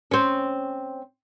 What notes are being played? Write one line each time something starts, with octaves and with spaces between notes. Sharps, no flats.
C4 C#4